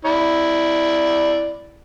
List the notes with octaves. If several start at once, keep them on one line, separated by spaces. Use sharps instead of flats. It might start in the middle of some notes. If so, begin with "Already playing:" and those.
E4 D5